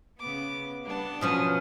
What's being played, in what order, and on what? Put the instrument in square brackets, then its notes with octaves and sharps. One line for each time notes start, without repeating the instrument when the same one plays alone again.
[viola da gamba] C#3 B3 [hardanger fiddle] D6
[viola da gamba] G3 D4 [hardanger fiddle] B3 A5
[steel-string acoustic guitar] B2 F3 C#4 [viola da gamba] F#3 [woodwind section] C5 D#6 F6